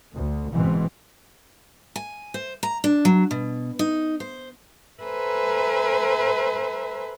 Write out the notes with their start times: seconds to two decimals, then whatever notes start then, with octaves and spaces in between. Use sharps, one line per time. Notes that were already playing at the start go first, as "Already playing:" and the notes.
0.14 D2
0.52 F#1 G#2 B2 E3 C4
1.96 G#5
2.34 C5
2.63 A#5
2.84 D4
3.05 F#3
3.31 B2
3.79 D#4
4.20 C5
5.01 A4 B4 C5 E5 G#5 A#5